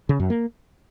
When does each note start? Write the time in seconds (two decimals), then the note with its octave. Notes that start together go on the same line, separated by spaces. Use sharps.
0.09 C#3
0.20 F#2
0.30 A#3